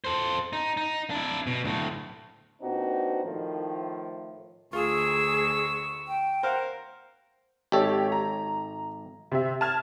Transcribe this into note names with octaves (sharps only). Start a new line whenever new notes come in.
A4 C5
D#4
D#4
D4 E4
B2
D2 A2
A#2 B3 C4 D4 D#4 F#4
A2 D#3 F3
D2 F4 G#4 C#6 E6
G5
A#4 C5 F5 F#5
G#1 G4 A4 C#5
A#5
C3 E5
A5 F6 G#6